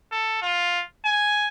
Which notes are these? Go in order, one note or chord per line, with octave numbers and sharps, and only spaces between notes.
A4
F4
G#5